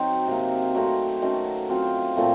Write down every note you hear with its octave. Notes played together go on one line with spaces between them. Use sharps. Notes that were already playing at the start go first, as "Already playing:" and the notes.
Already playing: F#3 C4 D#4
C3 F#3 A#3
F#3 A3 C4
D#3 A3 C#4 F#4
F#3 C4 F4 C5
A#2 F3 A3 C4